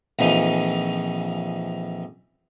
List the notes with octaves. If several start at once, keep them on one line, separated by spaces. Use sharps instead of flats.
A#1 F2 E3 D#4